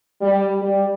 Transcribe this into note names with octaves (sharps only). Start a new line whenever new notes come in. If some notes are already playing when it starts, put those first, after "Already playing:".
G3
G3